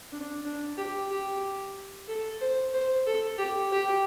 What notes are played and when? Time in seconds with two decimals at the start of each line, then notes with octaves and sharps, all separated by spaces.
0.12 D4
0.45 D4
0.77 G4
1.10 G4
2.08 A4
2.41 C5
2.74 C5
3.06 A4
3.38 G4
3.71 G4